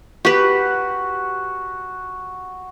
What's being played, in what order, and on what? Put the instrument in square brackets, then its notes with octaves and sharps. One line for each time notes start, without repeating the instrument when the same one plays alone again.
[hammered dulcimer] F#4 [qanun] G4 B4